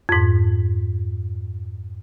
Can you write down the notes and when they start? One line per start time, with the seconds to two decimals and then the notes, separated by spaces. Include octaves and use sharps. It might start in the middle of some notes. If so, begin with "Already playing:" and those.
0.09 F2 G#2